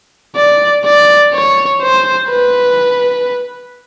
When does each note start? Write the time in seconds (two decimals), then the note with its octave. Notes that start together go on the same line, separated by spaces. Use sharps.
0.36 D5
0.85 D5
1.34 C#5
1.82 C5
2.30 B4